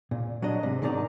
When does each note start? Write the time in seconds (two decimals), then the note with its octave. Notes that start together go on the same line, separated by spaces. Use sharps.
0.11 A#2
0.42 F#3 D4 D#5
0.63 G#2 C3
0.82 G#2 B2 D#3 D#4 D5 A#5